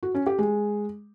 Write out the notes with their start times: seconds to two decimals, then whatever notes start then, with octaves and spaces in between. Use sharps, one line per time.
0.03 F#4
0.15 C#4
0.26 G4
0.38 G#3